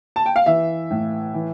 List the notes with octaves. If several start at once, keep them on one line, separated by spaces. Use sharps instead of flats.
A5
G5
F5
E3 E5
A2
E3